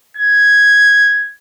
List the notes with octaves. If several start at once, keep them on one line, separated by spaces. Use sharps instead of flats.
G#6